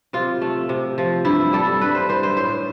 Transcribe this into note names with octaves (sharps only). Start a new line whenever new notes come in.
C3 F4
A3
C3
F3
G2 E4
G3 A4
G2 B4
C5
E3 C5
C5
A2 C5